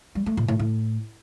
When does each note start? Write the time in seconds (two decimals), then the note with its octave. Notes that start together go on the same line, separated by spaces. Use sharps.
0.15 G3
0.26 A3
0.37 A#2
0.48 A2
0.59 A2